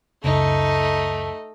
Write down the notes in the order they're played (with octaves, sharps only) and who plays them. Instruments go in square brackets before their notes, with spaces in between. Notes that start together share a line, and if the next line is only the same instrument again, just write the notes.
[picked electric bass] C#2 F#2 C#3 [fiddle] A3 [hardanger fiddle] D#4